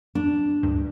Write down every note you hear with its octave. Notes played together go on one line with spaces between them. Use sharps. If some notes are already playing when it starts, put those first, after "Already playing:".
D4
D2 G2